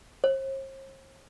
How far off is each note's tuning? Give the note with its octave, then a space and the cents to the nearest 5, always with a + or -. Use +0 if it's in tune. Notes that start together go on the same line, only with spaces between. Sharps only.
C5 +45